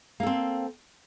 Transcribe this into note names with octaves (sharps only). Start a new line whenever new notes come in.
A#3 C4 A4